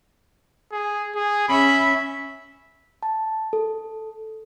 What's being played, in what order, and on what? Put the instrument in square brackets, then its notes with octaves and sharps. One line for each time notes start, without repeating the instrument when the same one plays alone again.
[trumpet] G#4
G#4
[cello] C#4 E5 [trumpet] B5
[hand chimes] A5
A4